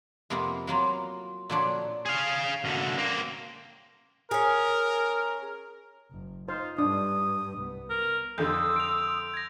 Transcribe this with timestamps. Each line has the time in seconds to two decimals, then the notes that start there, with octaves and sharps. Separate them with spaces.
0.30 F2 C3 A#3 B3 A#4
0.67 F#3 A#3 F4 A#4
1.50 A#2 D3 F3 F#3 D4 C#5
2.06 G#4 F5
2.65 F#2 D3
2.98 A#3 C4
4.31 C#4 G#4 A#4
6.12 F#1
6.48 D#4 F4 C5
6.78 G2 G3 D4 D#6
7.57 C2 B3
7.90 A#4
8.38 F2 D3 C6 D#6 E6 G6
8.76 D7 F7
9.34 G#6 A#6